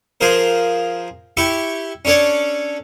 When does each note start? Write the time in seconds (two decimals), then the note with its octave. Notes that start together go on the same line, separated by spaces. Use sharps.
0.21 F3 G#4 A#4 C5
1.37 E4 G4 E5 C#6
2.05 C#4 D4 A4 C#5 D5